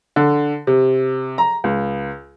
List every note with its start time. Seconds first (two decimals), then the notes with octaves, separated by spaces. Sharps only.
0.16 D3
0.67 C3
1.38 A#5
1.64 C#2